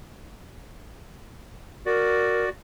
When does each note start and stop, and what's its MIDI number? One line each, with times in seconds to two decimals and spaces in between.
1.86 2.49 66
1.86 2.45 70
1.86 2.49 74